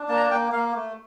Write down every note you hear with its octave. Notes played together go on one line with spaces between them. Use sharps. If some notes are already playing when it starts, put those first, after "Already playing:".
Already playing: D4
A#3 A5
A#5
A5
A#3 G5
A#3 F5
A3